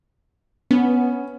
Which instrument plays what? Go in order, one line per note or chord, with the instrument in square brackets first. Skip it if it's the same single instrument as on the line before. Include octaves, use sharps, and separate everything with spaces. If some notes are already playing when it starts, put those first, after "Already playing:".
[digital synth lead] B3 [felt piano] C#4